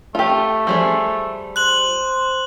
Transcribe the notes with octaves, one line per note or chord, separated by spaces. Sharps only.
A3 F4 G4
F3 G3 G#4
C5 F#6 F#7